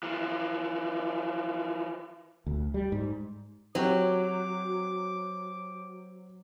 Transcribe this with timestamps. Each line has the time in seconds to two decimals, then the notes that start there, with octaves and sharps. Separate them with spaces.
0.03 E3 F3
2.46 D2
2.74 G3
2.92 G#2
3.75 F#3 C4 G4 C#5 D6